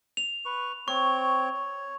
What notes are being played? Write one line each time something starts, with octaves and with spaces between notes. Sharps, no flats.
F7
B4 C#6
C4 C#5 C#6
C#5